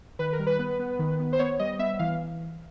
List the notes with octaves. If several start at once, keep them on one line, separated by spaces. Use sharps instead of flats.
D#3 B4
A#4
G3
B4
B3
B3
D#3
B3
C5
B3 C#5
G3 D#5
B3 E5
E3 F5